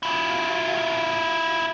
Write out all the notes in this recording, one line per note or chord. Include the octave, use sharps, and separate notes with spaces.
E4 F4